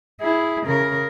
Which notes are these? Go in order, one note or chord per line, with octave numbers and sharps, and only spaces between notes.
E4 G#4
C#3 A#4